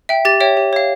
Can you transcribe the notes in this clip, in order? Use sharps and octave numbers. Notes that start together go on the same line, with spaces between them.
E5 G5
G4 A6
C#5 E5 G5
G4
C#5 F5